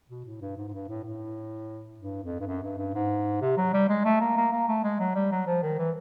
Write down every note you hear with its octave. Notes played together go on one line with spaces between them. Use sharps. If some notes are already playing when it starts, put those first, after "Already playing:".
B2
A2
G2
G#2
G#2
G2
A2
A2
G2
F2
G2
F#2
G2
G2
G#2
C3
F#3
G3
G#3
A3
A#3
A#3
A#3
A3
G#3
F#3
G3
F#3
F3
D#3
E3